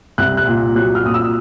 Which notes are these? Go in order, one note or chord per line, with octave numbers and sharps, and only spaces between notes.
C2 F#6
F#6
A#2
F#3 F#6
F6
A#2 D#6
E6